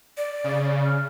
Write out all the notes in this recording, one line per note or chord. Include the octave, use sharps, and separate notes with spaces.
D5
C#3
F6